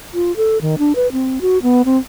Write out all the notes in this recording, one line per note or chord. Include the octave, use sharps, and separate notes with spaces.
F4
A4
D#3
D4
B4
C4
F#4
B3
C4